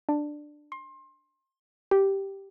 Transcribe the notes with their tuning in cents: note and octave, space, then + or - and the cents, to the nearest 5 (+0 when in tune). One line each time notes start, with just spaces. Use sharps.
D4 +10
C6 +25
G4 -5